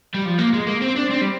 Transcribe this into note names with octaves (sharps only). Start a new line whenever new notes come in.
G3
F3
A#3
G#3
A#3
C4
D4
C4
G3